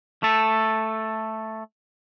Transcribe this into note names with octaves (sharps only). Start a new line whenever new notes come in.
A3 A4